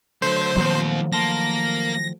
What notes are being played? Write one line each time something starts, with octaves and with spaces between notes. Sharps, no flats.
D3 F#3 A3 C5
D#2 A#2 F3 F#3 A3 B3 C4
D#3 A#3 A5 C6 A#6